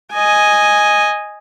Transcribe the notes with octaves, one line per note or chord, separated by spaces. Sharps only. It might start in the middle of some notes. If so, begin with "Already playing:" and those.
D#5 G#5